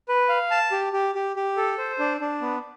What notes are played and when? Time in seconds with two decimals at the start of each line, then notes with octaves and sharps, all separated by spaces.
0.09 B4
0.29 F5
0.51 A5
0.72 G4
0.93 G4
1.15 G4
1.36 G4
1.57 A4
1.78 C5
1.99 D4
2.21 D4
2.41 B3